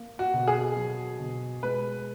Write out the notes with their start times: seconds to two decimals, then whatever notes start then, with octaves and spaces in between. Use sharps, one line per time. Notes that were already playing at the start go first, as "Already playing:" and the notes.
Already playing: A#3
0.19 F#4
0.34 B2
0.48 G#4
0.77 F#3
1.20 B2
1.63 G#3 B4